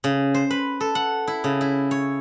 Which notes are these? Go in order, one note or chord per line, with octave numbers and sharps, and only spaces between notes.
C#3
C5
B4
A4
F#5
E4
C#3
E4
C#5